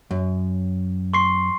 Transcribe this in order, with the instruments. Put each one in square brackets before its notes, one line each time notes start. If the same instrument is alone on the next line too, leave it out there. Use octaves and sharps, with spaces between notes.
[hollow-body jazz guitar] F#2
[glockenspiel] C6 C#6 C7